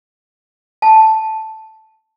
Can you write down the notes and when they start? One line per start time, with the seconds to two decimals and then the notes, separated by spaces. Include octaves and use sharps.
0.82 A5